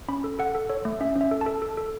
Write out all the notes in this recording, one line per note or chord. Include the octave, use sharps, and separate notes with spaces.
C#4 B5
A4
A4 F#5
A4
A4 C#5
A3
C#4 E5
C#4
E5
A4
A5
A4
A4
A4